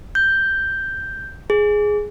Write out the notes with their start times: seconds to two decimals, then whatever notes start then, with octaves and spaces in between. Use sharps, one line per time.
0.15 G6
1.50 G#4